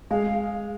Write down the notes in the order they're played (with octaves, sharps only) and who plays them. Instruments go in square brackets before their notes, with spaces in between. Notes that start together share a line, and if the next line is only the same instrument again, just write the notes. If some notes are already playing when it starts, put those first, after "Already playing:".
[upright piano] G#3 [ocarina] F5